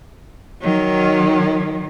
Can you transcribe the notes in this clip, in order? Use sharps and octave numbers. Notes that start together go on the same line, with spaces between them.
D#3 F#3